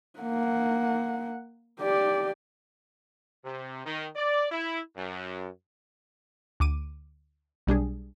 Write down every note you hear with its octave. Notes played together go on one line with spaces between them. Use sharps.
A#3 F#5
G4 D5
C3
D#3
D5
E4
F#2
D2 D6 D#7
B1 G3 D4 G#4